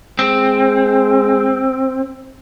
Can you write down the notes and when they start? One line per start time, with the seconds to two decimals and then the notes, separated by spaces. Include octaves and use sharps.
0.19 G#3 C4